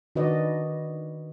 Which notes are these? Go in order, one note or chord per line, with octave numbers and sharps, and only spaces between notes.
D#3 D4 F#4 B4 D5 D#5